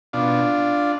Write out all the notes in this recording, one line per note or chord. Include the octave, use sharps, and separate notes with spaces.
B2 D4 F4